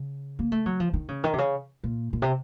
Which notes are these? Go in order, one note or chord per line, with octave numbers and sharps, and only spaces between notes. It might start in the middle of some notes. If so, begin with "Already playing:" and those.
Already playing: C#3
A#3
A3
F#3
F3
D#3
C#3
D#3
C3
C#3
A#2
A#2
C3